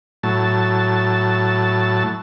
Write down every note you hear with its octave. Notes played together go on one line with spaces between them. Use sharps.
A2 F#3 A5